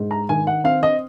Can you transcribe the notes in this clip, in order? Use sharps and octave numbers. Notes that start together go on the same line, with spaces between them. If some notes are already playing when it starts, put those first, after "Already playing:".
Already playing: G#2
A#5
D#3 G#5
F#5
C4 F5
D#5